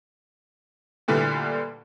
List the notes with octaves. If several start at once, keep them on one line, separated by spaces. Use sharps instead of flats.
A#2 D3 E3 G3 A3